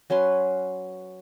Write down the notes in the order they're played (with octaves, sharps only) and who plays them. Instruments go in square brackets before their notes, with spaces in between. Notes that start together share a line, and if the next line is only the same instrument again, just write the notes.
[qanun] F#3 C#4 B4 C6